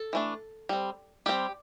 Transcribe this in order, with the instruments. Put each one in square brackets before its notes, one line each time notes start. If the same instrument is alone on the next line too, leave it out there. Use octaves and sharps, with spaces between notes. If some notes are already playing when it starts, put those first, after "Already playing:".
Already playing: [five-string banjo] A4
E3 A3 D4
G3 C4
G3 C4 G4